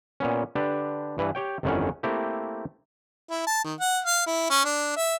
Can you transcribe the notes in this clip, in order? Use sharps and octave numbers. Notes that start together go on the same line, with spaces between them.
A#2 B3 C#4
D3 D4 G4 B4
G2 E3 B4
G4 C#5 G5
G1 F2 D#3 E3 C#4 F#5
A3 A#3 C4 E4 G4
E4
A5
D#3
F#5
F5
E4
C#4
D4
E5